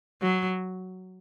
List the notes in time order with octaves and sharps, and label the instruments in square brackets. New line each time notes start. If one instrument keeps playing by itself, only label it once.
[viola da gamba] F#3